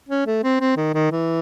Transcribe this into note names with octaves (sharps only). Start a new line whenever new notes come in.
C#4
A3
C4
C4
D#3
D#3
E3